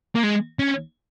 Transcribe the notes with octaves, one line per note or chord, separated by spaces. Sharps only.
A#3
G#3
C#4